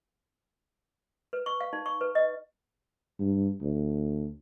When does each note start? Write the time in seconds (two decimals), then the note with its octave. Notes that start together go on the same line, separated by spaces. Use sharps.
1.33 B4
1.46 C#6
1.61 F5
1.73 D#4
1.86 C#6
2.01 B4
2.15 D#5
3.19 G2
3.61 D2